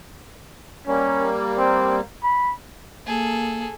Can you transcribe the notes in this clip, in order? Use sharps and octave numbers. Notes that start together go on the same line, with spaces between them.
G3 A#3 C#4
C4
B5
A#3 G#4 A4